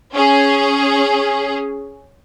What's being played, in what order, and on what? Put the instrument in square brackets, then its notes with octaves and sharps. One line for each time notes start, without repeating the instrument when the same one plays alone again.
[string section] C#4 G#4